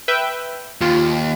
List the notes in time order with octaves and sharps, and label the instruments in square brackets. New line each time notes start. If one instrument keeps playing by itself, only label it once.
[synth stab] B4 E5 G5
[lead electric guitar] D#2 [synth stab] F4